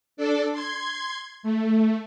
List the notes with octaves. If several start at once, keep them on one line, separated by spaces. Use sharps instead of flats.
D4 A4 D5
C6 G#6
A3